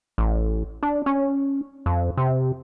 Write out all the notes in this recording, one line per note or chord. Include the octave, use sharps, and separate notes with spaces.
A1
D4
C#4
F2
C3